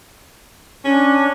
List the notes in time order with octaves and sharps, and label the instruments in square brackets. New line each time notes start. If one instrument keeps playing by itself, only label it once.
[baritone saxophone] C#4 [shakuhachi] D4